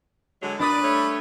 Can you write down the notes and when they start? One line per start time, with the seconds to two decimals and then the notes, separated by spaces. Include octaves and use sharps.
0.42 D3 F#3 G#3
0.60 A#2 D4 B4 D5 D#6 B6
0.82 G3 A3 C#5